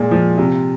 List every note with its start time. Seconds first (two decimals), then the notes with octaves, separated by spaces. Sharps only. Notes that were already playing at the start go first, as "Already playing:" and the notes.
Already playing: A#2 G#3
0.11 F3
0.38 C3